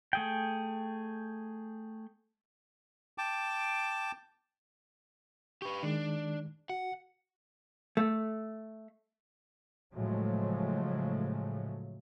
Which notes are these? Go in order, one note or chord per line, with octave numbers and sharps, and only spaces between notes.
A3 G#4 G5
G5 A5 D6
G4 B4 C#6
D#3 G#3 D4
F#4 F#5
A3
A2 C#3 F3 F#3 G#3 A3